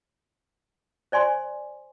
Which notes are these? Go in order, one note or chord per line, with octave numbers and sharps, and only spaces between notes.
C5 D5 G#5 C6